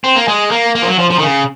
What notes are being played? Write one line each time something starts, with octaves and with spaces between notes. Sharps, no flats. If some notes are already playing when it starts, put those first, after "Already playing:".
C4
A#3
G#3
A#3
A#3
F3
F#3
F3
F3
D#3
C#3